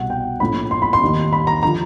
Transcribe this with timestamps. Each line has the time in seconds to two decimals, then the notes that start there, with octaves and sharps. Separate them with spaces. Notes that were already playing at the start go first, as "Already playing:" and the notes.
Already playing: C2 B2 F#5
0.10 G5
0.40 A#1 A2 F3 B5
0.71 C6
0.82 B5
0.93 C6
1.01 D#2 D#3
1.33 B5
1.47 A#5
1.63 D3 F3 A#5